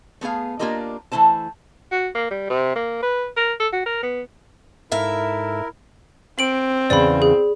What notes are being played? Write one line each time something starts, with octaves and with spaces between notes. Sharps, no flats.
A3 B3 G#4 F5
A#3 D4 F4 G4 A#4 D#5
E3 A3 E4 C5 A5
F#4
A#3
G3
C3
A#3
B4
A#4
A4
F#4
A#4
B3
G#2 E4 A4 A#4 E5 F5
C4 D7 F#7
E2 C#3 D5 B5
G#4